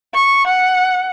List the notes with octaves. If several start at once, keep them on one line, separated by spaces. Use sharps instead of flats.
C#6
F#5